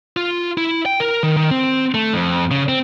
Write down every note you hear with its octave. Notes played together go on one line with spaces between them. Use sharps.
F4
E4
G5
A#4
D#3
D#3
C4
A3
F2
C#3
C4